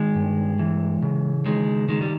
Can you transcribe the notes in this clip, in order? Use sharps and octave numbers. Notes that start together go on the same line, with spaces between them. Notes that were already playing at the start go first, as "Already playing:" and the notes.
Already playing: D#3 G#3
G2
E3
C#3
D#3 G#3
D#3 G#3
G3